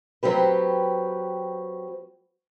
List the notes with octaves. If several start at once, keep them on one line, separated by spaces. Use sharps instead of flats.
F#3 C4 G4 B4